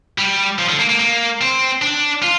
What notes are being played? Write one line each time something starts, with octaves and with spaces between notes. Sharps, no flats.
G3
F3
D3
A#3
A#3
A#3
C4
D4
F4